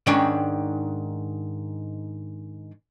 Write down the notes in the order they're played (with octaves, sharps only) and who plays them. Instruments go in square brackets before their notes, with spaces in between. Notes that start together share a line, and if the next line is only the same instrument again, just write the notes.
[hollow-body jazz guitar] G#2 D#3 C#4 D4 G5